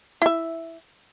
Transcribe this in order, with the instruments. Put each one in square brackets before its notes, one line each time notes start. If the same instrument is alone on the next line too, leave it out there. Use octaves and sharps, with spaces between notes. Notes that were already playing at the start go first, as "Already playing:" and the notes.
[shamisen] E4 E5